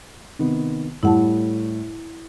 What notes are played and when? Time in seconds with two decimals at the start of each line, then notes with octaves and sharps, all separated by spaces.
0.39 C3 D#3 B3
1.03 A2 G3 A3 E4 F#5 A5